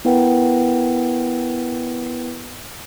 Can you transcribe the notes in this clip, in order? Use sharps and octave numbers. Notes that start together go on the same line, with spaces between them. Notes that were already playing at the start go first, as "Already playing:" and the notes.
B3 E4 A#4 B4 F#5 G5